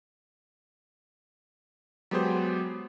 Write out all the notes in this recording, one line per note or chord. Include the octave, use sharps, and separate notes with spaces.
F#3 G#3 B3 G4 G#4 C5